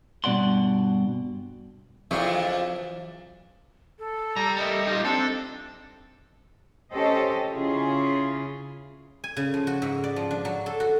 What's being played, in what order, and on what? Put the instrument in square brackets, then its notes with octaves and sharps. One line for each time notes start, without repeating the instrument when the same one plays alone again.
[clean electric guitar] G2 B2 D5 F#5 C6
[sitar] F2 [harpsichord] E3 D4 [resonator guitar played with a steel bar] F#3 F4 G#4
[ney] A4
[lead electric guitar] G3 [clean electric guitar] A#5
[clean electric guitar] A4 A#4 E5 [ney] D#5
[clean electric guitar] D#4 F4
[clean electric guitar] C4 [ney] D4 [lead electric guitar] A4
[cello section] C#4 G4 A4 C5 D#5
C#3 C#4 E4 F4 G#4
[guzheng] G#5
C#3
F3
F#4
G#2
D5
F3
D4
F#3
A4
F#4